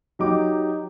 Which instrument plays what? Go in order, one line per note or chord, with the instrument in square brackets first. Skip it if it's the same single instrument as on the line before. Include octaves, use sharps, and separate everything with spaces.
[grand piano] F#3 D#4 G4 D6